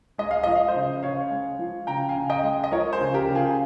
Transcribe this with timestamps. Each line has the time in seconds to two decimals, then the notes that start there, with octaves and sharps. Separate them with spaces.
0.18 G#3 D#5
0.31 F5
0.43 F3 D#5
0.56 F5
0.68 C5 D#5
0.75 C#3
1.03 C#3 C#5 F5
1.31 G#3
1.59 F3
1.87 C#3 G5 A#5
2.09 F5 G#5
2.16 C#3
2.30 D#5 G5
2.43 G#3
2.64 D#5
2.72 F3 A#4 C#5
2.93 G#4 C5
3.00 C#3
3.14 G4 A#4
3.29 C#3
3.35 F4 G#4